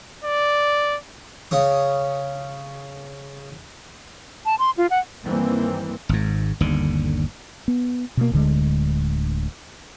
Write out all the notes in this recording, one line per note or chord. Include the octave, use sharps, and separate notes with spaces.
D5
C#3 C#4 D#6
A5
C6
F4
F#5
G2 D#3 E3 G3 A#3 C4
G#1 G#2
G1 D#2 D3
B3
B2 A#3
D1 D2 D3 G#3